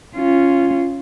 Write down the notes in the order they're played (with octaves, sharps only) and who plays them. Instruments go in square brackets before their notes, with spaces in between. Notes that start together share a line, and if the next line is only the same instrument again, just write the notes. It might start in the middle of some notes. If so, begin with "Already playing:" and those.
[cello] C#4 F4